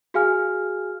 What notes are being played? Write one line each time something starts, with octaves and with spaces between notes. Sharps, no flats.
F#4 G#4 F5 G#5 F6